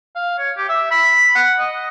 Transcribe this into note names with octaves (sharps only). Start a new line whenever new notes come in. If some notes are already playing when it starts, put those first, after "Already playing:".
F5
C#5
G4
E5
B5
F#5
D#5